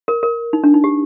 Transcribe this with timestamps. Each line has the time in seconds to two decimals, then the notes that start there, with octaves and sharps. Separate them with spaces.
0.08 A#4
0.23 A#4
0.53 D#4
0.64 D4
0.74 D#4
0.84 G4